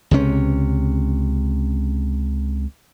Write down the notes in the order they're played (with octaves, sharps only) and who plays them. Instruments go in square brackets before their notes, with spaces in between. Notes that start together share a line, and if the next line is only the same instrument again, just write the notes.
[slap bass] C#2 C3 C#4